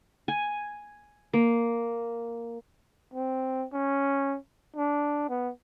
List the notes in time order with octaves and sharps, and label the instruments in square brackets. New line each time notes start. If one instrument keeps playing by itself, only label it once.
[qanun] G#5
A#3
[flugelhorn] C4
C#4
D4
B3